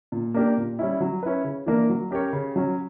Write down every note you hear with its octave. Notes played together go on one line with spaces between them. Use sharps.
A#2
A#3 D4 G4 A#4
A#2
G3 C#4 E4
F#3
C#4 E4 B4
C#3
E3 A#3 D4 A#4
F#3
C#4 G4 A#4 C#5
C#3
F#3 C#4